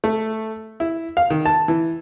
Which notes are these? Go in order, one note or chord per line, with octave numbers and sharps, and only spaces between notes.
A3
E4
F5
D#3
A5
E3